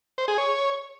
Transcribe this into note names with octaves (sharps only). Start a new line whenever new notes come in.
C5
G#4
C#5